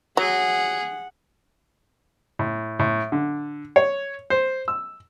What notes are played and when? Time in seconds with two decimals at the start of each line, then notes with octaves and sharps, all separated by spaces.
0.17 F#3 G#4 F#5
2.39 A2
2.79 A2
3.12 D3
3.76 C#5
4.30 C5
4.68 E6